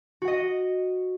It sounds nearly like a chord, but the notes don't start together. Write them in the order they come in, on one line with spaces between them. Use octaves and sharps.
F#4 F#5 D#5